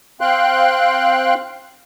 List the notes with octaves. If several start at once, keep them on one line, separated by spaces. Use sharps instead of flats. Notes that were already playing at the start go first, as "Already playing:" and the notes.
C4 F5 G5 C6 F#6